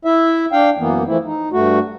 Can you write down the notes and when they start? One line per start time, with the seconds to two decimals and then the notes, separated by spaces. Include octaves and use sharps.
0.05 E4 E5
0.52 D4 F5 G5
0.78 F#2 E3 A#3 B3
1.07 E3 F3 A3 E4
1.25 D#4
1.52 G2 A3 F#4